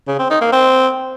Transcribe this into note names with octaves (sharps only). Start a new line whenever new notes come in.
C#3
C4
D#4
A#3
C4